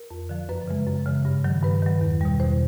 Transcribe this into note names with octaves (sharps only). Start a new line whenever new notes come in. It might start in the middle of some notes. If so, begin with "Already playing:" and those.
Already playing: A#4
F2
D3 F3
F#2 B4
C#3 E3 G#3
F#2
C#3 E3 G#3
G2
D#3 F#3
G2 B4
D#3 F#3
E2
B2 G3
E2 C5